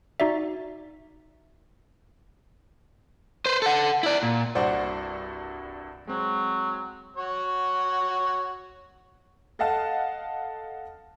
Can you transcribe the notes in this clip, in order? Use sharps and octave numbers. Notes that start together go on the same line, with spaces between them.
D#4 F#4 D5 E5
B4 C5
A4 F#5
E4 D5
A#2
C2 G2 F#4 C5 D5 F#5
F#3 G#3 C4
F#4 C#5
A4 D#5 F5 F#5 A5